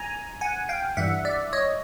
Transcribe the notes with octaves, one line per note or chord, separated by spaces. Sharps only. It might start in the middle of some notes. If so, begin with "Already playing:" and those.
Already playing: G#5 A#5
F#5 G#5
F5 G5
G2 E3 G3 E5 F#5
D5 E5
C#5 D#5